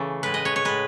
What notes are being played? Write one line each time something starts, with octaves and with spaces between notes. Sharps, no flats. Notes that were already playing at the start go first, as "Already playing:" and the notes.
Already playing: C#3 E3 A3
A2 G#3 B4
D#5
C#5
C#5
A2 G#3 B4